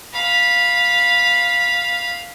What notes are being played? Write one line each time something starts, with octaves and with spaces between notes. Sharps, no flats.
F5 B5